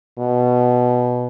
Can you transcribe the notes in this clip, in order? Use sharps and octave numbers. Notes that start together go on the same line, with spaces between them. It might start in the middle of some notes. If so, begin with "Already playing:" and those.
B2